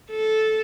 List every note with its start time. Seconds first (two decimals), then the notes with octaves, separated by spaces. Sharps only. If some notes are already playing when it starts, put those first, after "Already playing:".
0.10 A4